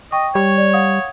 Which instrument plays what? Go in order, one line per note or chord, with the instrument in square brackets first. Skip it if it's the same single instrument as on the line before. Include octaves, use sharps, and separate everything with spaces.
[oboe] D#5 [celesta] G5 C#6
[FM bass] G3 [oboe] C#5
[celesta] D5
F5 F#5 D#6